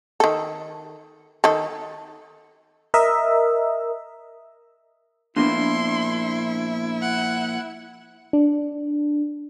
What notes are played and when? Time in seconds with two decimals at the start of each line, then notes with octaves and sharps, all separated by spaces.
0.20 D#3 A4
1.44 D#3 A4
2.94 A#4 D#5 E5
5.36 A#2 F3 B3 D4 E4 C6
7.02 F#5
8.33 D4